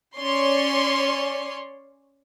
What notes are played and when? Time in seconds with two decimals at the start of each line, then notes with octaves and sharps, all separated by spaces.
0.16 C#4 C#5 D5 C6